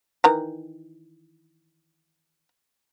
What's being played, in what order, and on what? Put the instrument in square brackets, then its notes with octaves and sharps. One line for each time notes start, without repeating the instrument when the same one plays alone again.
[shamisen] D#3 E3 A#5